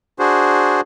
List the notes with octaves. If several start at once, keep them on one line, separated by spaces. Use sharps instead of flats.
D4 F#4 G#4 C5